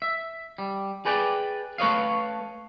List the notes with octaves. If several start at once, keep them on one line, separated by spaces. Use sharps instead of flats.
E5
G3
G#4 B4 D5 G5
A3 B4 C#5 D#5 F5